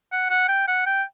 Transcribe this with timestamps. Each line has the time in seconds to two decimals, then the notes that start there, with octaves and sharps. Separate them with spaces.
0.12 F#5
0.30 F#5
0.48 G5
0.68 F#5
0.86 G5